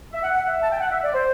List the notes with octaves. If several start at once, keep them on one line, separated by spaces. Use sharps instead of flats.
E5
F#5
F#5
E5
A5
G5
F#5
E5
D5
C5